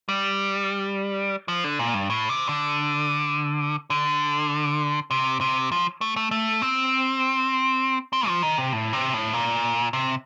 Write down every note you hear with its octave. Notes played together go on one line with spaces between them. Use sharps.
G3
F3
D3
A#2
G2
A2
C3
D3
D3
C3
C3
F3
A3
A3
A3
C4
C4
F3
D#3
C3
A2
C3
A2
A#2
C3